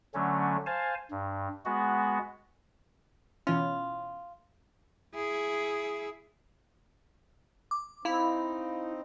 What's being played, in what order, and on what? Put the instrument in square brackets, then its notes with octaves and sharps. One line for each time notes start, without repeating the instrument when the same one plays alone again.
[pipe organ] D3 F#3 A3 C#4
C5 F5 G#5 A5
G2
G#3 B3 F#4
[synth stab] B2 E3 C#4 [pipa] F4
[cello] E4 G#4
[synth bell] D6
[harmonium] C4 D#4 [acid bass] E4 [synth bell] F5 B5